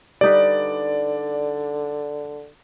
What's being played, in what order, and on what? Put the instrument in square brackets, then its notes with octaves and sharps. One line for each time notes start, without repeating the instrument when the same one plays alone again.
[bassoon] D3 [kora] G3 D#4 B4 [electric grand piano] D5